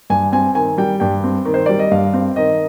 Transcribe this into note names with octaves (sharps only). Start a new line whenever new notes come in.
G2 G#5
C4 G#5
D#3 G#5
G3 G5
G2 G5
C4
D#3
C5
G3 D5
D#5
G2 F5
C4
D#3 D#5